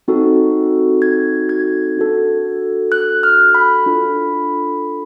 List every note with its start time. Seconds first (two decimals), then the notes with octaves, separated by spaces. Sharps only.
0.08 C4 D#4 F#4 A4
1.02 G#6
1.49 G#6
1.97 D4 F#4 A4
2.92 F#6
3.23 F6
3.55 B5
3.86 D4 F4 A4